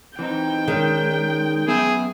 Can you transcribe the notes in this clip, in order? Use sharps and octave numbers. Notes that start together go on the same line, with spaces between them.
E3 C4 D#4 G5
D#3 G#3 C#4 D4
F#2 B3 G#4 E5